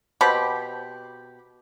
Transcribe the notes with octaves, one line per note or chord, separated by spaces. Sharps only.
B2 C4 G4 B5